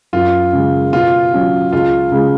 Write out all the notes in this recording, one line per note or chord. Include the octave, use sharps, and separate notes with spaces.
F#2 F4
C#3 G#3
B2 F4
F#3 C#4 F#4
C#2 F4
C#3 G#3 C#4